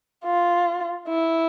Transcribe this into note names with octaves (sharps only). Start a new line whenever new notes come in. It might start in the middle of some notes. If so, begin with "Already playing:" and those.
F4
E4